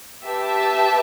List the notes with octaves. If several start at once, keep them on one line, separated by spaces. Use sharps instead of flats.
G4 B4 E5 A5